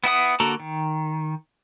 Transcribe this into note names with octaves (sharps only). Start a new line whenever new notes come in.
B3 E4 F#5 D#6
D3 A#3 F#4 A4 A#5
D#3